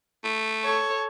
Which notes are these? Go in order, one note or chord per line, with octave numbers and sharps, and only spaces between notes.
A3
A4 C#5